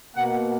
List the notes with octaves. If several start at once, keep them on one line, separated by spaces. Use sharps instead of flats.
B2 A#3 F#5